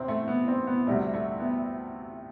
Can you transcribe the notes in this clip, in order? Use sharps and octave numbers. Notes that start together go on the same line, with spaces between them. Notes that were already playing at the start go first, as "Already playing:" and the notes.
Already playing: E2 C3 C4 E4
A3
B3
C4
B3
D2 C3 G3 A3
A3
B3